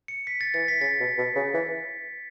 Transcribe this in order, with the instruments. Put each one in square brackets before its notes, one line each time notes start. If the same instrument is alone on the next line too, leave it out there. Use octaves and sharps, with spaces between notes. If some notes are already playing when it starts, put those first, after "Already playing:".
[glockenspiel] C#7
B6
A6
[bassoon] E3 [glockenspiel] A6
[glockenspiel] B6
[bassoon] C#3 [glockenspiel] A6
[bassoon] B2
B2
C#3
E3